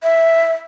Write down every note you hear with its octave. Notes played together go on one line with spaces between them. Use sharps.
E5